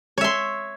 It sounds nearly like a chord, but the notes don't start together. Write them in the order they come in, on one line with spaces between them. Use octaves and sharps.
C#5 E5 C6